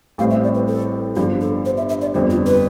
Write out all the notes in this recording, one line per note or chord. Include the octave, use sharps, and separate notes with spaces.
A1 A2 G3 C4 F5
E5
D5
B4
A4
G1 G2 D3 F3 G4
A4
C5
E5
E5
D5
G1 F2 D3 G3 C5
F4
B4